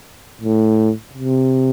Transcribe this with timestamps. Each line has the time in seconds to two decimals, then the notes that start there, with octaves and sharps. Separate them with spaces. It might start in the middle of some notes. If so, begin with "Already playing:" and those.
0.41 A2
1.13 C3